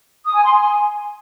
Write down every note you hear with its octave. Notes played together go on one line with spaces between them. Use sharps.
D#6
G#5
C6
G#5